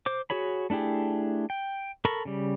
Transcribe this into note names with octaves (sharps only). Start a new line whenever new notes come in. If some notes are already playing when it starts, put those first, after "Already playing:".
C5 D6
F#4 G#4 C#5 B5
A3 D4 E4 G4 G#4
G5
A4 A#4 B5 C#6
C#3 G3